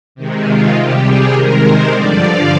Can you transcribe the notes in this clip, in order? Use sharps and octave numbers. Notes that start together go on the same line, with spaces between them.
C3 D#3 G#3
F4
C3 G3 G4
G#4
C3 D#3 G#3 A#4
C5
G2 D3 F3 D5
F5